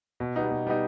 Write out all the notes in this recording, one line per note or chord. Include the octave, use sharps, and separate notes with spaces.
B2
G3 B3 D#4
B2
G3 B3 D#4